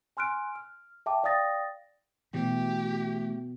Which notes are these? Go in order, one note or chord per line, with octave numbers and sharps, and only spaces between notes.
G#5 C6 F6 F#6 D7
F6
E5 G5 A5 D6
D5 F5 G5 D#6 A6 A#6
B2 E3 A3 G4